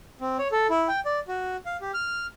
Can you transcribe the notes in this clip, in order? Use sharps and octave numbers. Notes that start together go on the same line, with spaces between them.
C4
C#5
A4
E4
G5
D5
F#4
F5
G4
F6